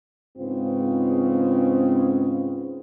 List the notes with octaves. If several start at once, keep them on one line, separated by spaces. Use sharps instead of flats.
G#2 C#3 B3 C4 F4